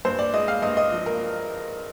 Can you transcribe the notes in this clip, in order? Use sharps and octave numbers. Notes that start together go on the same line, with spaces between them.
G2 C5
D5
G#3 D#5
F5
G2 D#5
D#5
F3
A#4